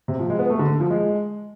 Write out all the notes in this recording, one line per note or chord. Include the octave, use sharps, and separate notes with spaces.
C3
F3
G#3
B3
A3
D3
F3
G#3